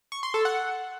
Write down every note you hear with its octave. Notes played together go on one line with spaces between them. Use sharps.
C#6
C6
A4
F#5